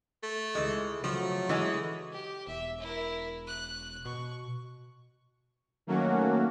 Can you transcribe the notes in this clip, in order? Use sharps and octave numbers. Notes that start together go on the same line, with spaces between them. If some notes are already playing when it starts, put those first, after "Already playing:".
A3
C#2 E3 G#3
C#3 F3 F#3 A3
E3 G#3 G#4
G4
E1 E5
E4 A#4
F#6
B2 C#6
D#3 F#3 A3 A#3 C#4 F#4